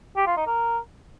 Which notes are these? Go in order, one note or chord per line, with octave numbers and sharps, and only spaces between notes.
G4
F4
D#4
A#4